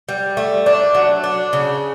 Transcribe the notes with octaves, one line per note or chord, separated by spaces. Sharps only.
G3
A3
D4
F#3
D4
C#3